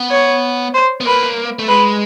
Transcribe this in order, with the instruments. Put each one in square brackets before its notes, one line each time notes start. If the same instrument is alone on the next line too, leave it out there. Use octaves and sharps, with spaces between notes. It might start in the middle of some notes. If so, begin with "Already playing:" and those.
Already playing: [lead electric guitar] B3
[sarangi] C#5
C5
[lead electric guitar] B3
[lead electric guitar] A#3 [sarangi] B4
[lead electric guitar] A3
[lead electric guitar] G#3 [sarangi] B4